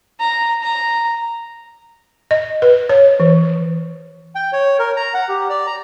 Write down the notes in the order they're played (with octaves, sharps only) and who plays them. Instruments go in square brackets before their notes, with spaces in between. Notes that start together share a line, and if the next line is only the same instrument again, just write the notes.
[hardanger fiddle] A#5
A#5
[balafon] D#5
B4
C#5
E3
[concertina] G5
C#5
A#4
A#5
F#5
G4
D5
A#5